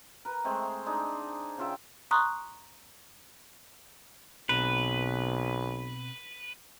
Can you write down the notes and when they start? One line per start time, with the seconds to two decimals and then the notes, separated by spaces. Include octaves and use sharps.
0.25 A#4 B4
0.44 G#3 A3 C4 G#4
0.86 D4 D#4 G#4
1.58 C#3 F4 E5 G5
2.11 A#5 C6 C#6 D#6 F#6
4.49 B1 B2 C4 B4 A#5